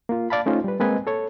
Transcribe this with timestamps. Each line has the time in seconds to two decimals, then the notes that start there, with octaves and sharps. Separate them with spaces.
0.09 A#3 F4
0.30 D5 F5 A5 B5
0.46 A3 C#4 D#4 F4 C5
0.64 G3 B4
0.80 G#3 A#3 C4 B4 D#5 G#5
1.07 A4 C#5